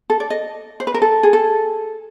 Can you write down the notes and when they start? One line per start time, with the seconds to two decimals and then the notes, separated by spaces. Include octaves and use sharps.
0.10 A4
0.20 D5
0.30 D#5
0.80 C5
0.87 B4
0.94 A#4
1.02 A4
1.23 G#4
1.33 A4